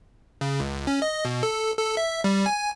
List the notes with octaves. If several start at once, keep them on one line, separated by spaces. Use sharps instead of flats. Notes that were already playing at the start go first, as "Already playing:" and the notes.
C#3
C#2
C#4
D#5
B2
A4
A4
E5
G3
G#5